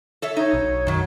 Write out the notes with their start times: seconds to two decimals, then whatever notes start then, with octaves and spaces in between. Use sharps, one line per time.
0.22 A4 C#5 E5
0.37 D#4 C#5
0.53 B1
0.87 F#2 D#3 F#3